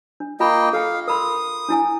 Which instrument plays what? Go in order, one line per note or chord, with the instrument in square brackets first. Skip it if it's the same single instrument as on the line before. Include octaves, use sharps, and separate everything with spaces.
[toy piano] D4
[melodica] A#3 D#5 G5 [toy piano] F4 A#5 B5
[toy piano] A4 G5 [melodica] F5
[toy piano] A#4 B5 C6 [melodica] D#6
[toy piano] D4 E4 G#5